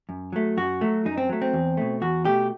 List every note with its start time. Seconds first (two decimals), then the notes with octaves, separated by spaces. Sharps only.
0.09 F#2
0.33 F#3 A3
0.57 F#2 F#4
0.81 F#3 A3
1.05 F#2 D#4
1.18 C4
1.29 F#3 A3
1.42 C4
1.53 E2
1.77 B2 A3
2.01 E2 F#4
2.25 B2 A3 G4